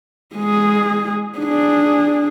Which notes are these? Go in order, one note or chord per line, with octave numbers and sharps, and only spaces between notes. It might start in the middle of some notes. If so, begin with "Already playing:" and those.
G#3 G#4
D4 G#4